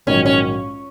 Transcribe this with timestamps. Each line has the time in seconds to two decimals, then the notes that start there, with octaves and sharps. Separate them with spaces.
0.07 A#1 G#2 D#3 F#3 C#4
0.26 C#4